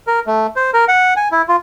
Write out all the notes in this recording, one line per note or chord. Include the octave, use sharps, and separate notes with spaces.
A#4
A3
C5
A#4
F#5
G#5
E4
F4